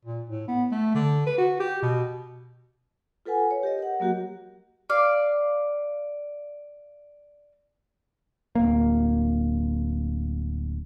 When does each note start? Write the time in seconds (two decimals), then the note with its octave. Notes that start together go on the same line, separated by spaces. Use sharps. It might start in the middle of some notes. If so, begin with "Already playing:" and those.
0.05 A#2
0.29 A2
0.48 B3
0.71 A3
0.95 D3
1.26 B4
1.38 F#4
1.60 G4
1.82 B2
3.26 F4 A4 B4 F#5 G#5
3.51 C#5
3.63 G4 A#4 D#5
3.79 A#4 F#5
4.00 F#3 A#3 F#4 G4 F#5
4.90 D5 F5
8.55 D1 A#3